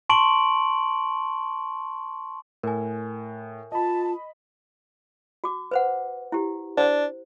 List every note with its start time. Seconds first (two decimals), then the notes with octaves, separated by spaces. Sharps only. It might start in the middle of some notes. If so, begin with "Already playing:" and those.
0.10 A5 C6 C#6 D7 F#7
2.63 A2 A#4 G#5
3.72 F4 D#5 A5 B5
5.44 F#4 D6
5.71 B4 C5 F#5
6.32 E4 G4
6.77 D4 C5